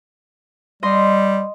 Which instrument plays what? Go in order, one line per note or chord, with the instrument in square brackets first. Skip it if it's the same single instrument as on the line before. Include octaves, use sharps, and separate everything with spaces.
[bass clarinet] G3 [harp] D#5 C6